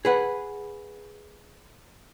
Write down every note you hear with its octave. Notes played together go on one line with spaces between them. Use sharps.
G#4 B4 F#5